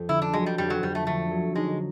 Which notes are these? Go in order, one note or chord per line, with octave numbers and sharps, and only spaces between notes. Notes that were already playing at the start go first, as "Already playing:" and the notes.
Already playing: F2
D3 E4
D4
F#3 G#3
G3
F2 G3
F#3
F2 G3
A3
D3 A3
F#3
G#3 D#4